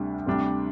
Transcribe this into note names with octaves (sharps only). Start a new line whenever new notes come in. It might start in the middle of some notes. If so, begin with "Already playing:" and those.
Already playing: D2 C3 G3 D4
D2 C3 G3 D4